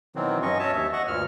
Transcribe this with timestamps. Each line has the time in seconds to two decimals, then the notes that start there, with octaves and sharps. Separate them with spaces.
0.16 B2 D#3 E3 F#3 C4
0.43 G2 F#3 C#4 D#5 C#6
0.59 C#5 D#5 E5 A5
0.73 D#2 E5
0.93 D#5 F#5 C#6
1.08 D2 G2 A#2 F6